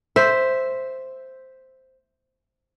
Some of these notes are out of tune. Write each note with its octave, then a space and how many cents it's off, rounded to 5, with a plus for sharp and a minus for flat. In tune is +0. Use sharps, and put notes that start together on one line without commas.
C5 +0 E5 +0